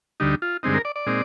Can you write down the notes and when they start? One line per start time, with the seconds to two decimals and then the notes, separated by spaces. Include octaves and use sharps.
0.20 D2 D3 G3 D#4
0.42 F4
0.63 G2 D3 G#3 C4 D#4
0.74 A#4
0.85 D5
0.96 D5
1.07 A#2 G#3 C4 D#4